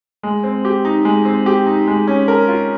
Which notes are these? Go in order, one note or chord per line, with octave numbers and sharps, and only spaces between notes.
G#3
C4
G4
D#4
G#3
C4
G4
D#4
G#3
C#4
A#4
F4